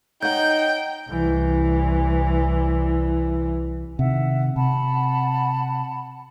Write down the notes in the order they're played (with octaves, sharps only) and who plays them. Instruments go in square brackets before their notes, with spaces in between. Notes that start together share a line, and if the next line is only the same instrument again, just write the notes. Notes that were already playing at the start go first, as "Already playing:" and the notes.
[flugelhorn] D#4 [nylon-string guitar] C#5 F#5 [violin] G5 [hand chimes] G6
[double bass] C2 E3
[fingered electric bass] C3 D#3 [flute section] E5 F#5
[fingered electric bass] C3 [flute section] F#5 A5 B5